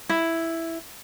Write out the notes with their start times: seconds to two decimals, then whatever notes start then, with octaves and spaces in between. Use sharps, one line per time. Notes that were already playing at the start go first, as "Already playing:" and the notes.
0.09 E4